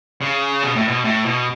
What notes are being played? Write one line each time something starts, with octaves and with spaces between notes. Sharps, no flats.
C#3
B2
A2
B2
A2
B2